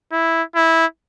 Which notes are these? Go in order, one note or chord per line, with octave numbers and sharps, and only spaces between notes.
E4
E4